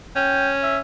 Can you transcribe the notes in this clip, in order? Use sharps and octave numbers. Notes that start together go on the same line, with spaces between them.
C#4 G5
E5